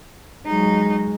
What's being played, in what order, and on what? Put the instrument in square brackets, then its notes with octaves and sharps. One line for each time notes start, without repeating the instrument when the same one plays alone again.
[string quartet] F#3 D#4 [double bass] G#3